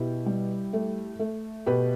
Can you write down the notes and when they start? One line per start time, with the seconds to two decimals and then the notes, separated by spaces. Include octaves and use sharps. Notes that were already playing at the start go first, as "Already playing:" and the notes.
Already playing: B2 E4 G4
0.26 G3
0.73 A3
1.19 A3
1.66 B2 G4 B4